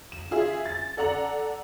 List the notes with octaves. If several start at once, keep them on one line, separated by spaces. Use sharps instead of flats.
E7
F4 G#4 E5
A6
A4 D5 F#5 A#5 F#7